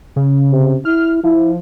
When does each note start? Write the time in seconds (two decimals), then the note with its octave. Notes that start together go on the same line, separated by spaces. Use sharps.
0.16 C#3
0.51 C3
0.85 E4 F6
1.24 F3 E4